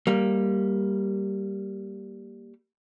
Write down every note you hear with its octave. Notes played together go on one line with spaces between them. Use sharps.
G3 A#3